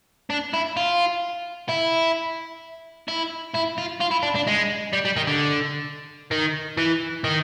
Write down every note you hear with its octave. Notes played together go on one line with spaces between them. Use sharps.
D4
E4
F4
E4
E4
E4
F4
F4
E4
D4
D4
G#3
G3
G3
D#3
D3
D#3
E3
D#3